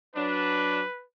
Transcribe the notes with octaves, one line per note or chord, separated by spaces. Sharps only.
F#3 D4 B4